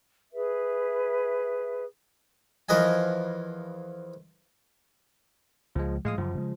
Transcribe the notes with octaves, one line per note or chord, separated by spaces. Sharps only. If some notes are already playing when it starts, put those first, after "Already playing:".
G#4 B4 E5
E2 F3 A#4 B4 D#5 G#5
C#2 F3 G#3
A2 F3 G#3 F5 D#6
F#2 C#3 F3
C#3 G3 G#3